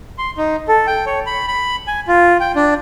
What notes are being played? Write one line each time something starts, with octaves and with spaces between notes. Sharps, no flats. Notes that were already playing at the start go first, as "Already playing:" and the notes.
C6
D#4
A4
G5
C#5
B5
B5
G#5
F4
G5
D4